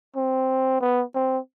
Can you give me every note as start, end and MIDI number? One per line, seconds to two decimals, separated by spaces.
0.16 0.81 60
0.81 1.04 59
1.15 1.39 60